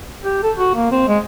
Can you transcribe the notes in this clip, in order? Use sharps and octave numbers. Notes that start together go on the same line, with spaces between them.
G4
A4
F#4
A#3
C4
G#3